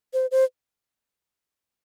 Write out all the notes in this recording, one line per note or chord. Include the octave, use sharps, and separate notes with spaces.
C5
C5